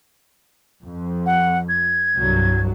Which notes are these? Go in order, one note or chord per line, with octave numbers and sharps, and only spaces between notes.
F2
F#5
G#6
C2 G2 F#3